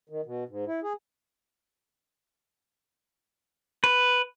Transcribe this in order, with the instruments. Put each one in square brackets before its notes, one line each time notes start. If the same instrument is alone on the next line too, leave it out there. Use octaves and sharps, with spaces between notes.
[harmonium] D#3
B2
G#2
E4
G#4
[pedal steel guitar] B4